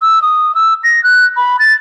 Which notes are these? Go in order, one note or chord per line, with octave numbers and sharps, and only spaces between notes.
E6
D#6
E6
A#6
F#6
B5
A6